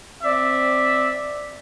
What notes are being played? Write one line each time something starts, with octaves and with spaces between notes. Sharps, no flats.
C4 D5 E5